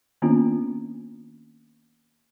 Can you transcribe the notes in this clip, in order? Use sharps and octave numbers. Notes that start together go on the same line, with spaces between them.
D#3 A#3 B3 C#4 D4 F4